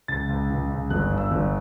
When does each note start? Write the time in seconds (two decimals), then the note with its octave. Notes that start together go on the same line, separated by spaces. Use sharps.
0.08 C#2 A6
0.29 C#2
0.50 C#2
0.70 C#2
0.90 G1 F#6
1.11 G2
1.18 E6
1.31 G1